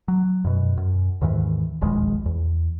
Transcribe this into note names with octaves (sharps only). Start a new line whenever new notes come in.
F#3
F#2 B2
F#2
D#2 G#2 D#3 E3
E1 A#1 D#2 G#3
E2